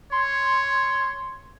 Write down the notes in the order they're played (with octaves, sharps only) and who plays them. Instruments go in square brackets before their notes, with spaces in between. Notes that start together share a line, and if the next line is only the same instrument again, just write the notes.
[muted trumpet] C#5 [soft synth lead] C6